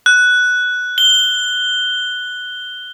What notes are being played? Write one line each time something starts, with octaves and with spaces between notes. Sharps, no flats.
F#6
G7